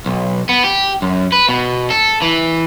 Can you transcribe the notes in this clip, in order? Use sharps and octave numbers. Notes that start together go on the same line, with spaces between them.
B1
B3
G4
F#2
B4
B2
A4
E3